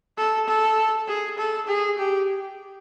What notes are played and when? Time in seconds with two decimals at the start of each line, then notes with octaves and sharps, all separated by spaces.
0.18 A4
0.47 A4
1.08 G#4
1.38 A4
1.68 G#4
1.98 G4